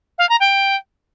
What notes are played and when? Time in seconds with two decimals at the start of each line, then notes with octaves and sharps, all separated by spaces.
0.18 F5
0.29 A#5
0.40 G5